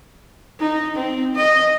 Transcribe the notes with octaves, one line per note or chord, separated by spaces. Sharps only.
D#4
C4
D#5